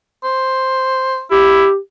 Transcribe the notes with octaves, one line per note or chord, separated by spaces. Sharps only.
C5
E4 G4